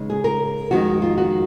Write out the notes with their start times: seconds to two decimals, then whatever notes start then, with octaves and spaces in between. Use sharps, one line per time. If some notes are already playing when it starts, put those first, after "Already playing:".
Already playing: C#3 G#3 B3 D#4
0.10 G#4
0.24 A#4
0.71 F2 D#3 G#3 F#4
1.02 F4
1.18 F#4